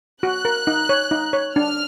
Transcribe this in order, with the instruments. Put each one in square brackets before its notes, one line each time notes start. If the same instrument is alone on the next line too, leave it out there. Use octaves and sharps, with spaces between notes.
[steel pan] F#4 [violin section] F#6
[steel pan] A#4
D#4
C#5
D#4
C#5
[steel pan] D4 [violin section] F6